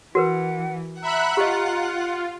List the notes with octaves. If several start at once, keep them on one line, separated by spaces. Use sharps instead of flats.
E3 F#4 A#4 B4 F#5
E5 F#5 A#5 B5 F#6
F4 G4 D#5